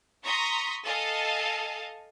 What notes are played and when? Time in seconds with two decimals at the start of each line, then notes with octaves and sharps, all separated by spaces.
0.25 A#5 C6 C#6 D#6 A#6 B6
0.85 A4 D#5 F5 G#5 A5